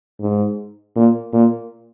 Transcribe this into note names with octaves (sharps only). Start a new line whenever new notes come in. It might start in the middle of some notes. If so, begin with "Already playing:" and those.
G#2
A#2
A#2